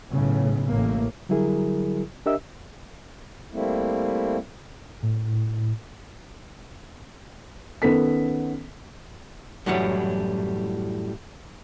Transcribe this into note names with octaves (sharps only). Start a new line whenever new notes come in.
B1 A2 C#3
A1 A2 A3 A#3
D3 F#3 G3 E4 G#4 A#4
D4 G4 A#4 D#5 E5 E6
G3 A3 A#3 C4 E4
A2
D#3 B3 C#4 A4 B6
F#2 A2 E3 F#3 G3